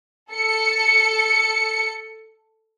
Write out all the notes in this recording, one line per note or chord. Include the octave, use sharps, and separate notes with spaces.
A4 C#7